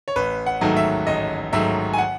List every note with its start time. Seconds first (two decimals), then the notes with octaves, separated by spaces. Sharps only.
0.08 C#5
0.16 A1 B4
0.46 F#5
0.61 G#2 D#3 F#3 A3
0.76 E5
1.07 A1 D#5
1.53 G#2 D#3 F#3 A3 E5
1.93 G#5
1.98 F#5